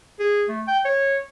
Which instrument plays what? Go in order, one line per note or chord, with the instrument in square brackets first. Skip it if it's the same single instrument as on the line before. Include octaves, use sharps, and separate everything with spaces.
[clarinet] G#4
A3
G5
C#5